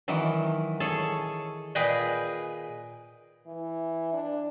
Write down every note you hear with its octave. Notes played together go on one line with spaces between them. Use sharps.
D#3 E3 F#3
G#4 A4 C#5
A#2 G#4 B4 D#5 G5 G#5
E3
D4